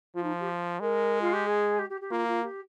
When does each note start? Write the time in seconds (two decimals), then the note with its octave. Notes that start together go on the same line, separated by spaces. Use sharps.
0.15 F3 F4
0.23 D#4
0.40 G4
0.80 G#3 A#4
1.21 F4
1.33 G4
1.46 G#4
1.79 G4
1.90 G4
2.01 G4
2.11 A#3 F4
2.28 F4
2.43 G4